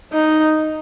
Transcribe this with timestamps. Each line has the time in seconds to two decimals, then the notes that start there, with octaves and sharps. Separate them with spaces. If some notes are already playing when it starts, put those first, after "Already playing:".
0.13 D#4